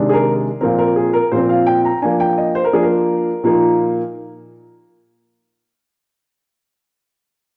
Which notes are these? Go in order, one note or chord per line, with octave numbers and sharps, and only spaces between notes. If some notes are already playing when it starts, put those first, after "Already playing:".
Already playing: C3 D#3 G#3 D4
G#4
A#4
A#2 F3 C4 A#4
A#4
G#4
A#4
A#2 F3 C4 C5
F5
G5
A#5
F3 A#3 D4 G#5
G5
D#5
C5
A#4
F3 A#3 D4 G#4
A#4
A#2 F3 A#3 D#4